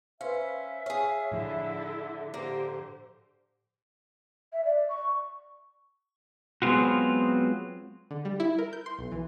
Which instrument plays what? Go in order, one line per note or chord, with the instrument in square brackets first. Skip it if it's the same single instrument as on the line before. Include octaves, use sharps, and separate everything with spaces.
[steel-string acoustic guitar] C#4 [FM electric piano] B4 C5 F5 [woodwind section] E5
[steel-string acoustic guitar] G#4 F5 [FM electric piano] C#5
[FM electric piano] A2 F3 [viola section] D3 E4 A4
[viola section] D3 G4 C5 [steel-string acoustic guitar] A#3
[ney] E5
D5
C#6
[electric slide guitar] F#3 G#3 B3 C4 F4 F#4
[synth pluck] D3
G3
E4
A#4
G6
C6
B1
E3